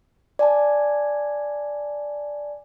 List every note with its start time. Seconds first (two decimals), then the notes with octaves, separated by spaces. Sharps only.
0.39 D5 G#5 A5